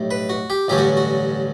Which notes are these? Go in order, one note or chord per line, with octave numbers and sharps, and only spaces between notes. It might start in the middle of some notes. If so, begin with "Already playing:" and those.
Already playing: B1 A2 G3
B4
F#4
G4
A1 G2 D3 F#3 C#4 G4
F#4
F#4